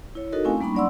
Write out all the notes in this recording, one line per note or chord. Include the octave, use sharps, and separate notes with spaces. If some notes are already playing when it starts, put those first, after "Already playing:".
E4 C#5
D#4 F#4 A4 A#4 D#5
A3 C4 C#4 E4 F5 G#5
G3 A#3 D4 D#4 B5 C#6
F#3 C#4 D5 F#5 C6 E6